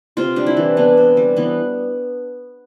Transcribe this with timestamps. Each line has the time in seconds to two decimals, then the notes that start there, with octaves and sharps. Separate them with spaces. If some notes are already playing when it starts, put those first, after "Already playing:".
0.17 C3 F4
0.36 G3 D4
0.47 E4
0.57 E3
0.77 B3 D4
0.97 C3
1.17 G3
1.37 E3 B3